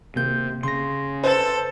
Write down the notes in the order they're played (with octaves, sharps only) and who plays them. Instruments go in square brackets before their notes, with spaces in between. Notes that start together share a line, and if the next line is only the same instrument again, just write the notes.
[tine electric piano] G#1 A#3 G6 [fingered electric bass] C3
[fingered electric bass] C#3 [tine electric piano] C6 A#6
[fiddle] A4 [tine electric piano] B4 [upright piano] C5